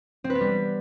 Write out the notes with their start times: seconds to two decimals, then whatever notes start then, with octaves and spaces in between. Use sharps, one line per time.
0.24 C4
0.30 B4
0.35 B3
0.41 G3